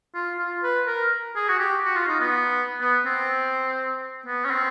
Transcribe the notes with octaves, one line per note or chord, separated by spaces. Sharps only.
F4
F4
B4
A#4
G#4
F#4
G4
F#4
F4
D#4
B3
B3
C4
B3
C#4
C4